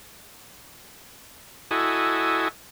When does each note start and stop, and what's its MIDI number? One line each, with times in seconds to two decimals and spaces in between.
1.71 2.48 64
1.71 2.48 66
1.71 2.48 69
1.71 2.48 75
1.71 2.48 80